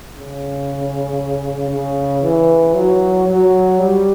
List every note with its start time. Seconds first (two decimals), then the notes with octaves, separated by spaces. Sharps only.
0.13 C#3
1.70 C#3
2.22 E3
2.74 F#3
3.27 F#3
3.79 G3